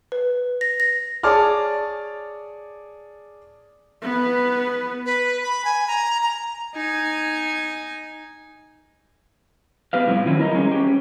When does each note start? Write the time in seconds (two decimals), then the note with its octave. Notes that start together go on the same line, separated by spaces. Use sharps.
0.12 B4
0.61 A#6
0.80 A#6
1.23 G#4 C#5 D5 A5 D6 F6
4.02 B3 B4
5.06 B4
5.43 B5
5.65 G#5
5.88 A#5
6.23 A#5
6.75 D#4 G#5
9.93 B3 G4 B4 F5
10.06 A2 C3 F3 G3 E4
10.26 D3 D#3 F3 F#3 A3 C#4
10.39 E4 A#4 D#5 A#5
10.55 G3 G#3 C#4
10.72 C#4 G4